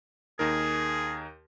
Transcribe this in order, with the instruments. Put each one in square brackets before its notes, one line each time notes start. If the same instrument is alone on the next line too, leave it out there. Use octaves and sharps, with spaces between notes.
[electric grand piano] D#2 D#4 A#4 [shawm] G#4